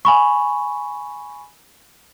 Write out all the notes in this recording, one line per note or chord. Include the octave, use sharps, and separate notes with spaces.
G#5 B5 C#6